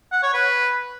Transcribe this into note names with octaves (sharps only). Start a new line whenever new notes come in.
F#5
C#5
B4